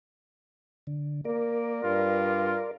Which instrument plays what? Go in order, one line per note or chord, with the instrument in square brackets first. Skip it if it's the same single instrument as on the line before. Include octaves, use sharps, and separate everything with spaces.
[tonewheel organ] D3
[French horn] A#3 [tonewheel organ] A#4 D5
[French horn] G2 [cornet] F4